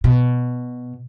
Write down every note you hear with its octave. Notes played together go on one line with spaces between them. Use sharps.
B2